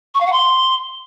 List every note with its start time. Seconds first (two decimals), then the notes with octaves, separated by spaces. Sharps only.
0.14 C#6
0.20 F5
0.26 F#5
0.32 C6